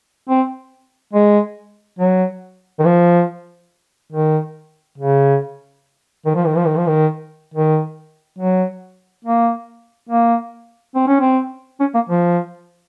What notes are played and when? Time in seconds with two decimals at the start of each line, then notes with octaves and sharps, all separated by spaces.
0.29 C4
1.14 G#3
1.99 F#3
2.79 D#3
2.85 F3
4.13 D#3
4.98 C#3
6.26 D#3
6.35 F3
6.46 D#3
6.56 F3
6.66 D#3
6.77 F3
6.87 D#3
7.54 D#3
8.39 F#3
9.25 A#3
10.09 A#3
10.95 C4
11.07 C#4
11.20 C4
11.80 C#4
11.95 A#3
12.09 F3